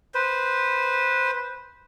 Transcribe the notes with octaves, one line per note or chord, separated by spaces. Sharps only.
B4 C5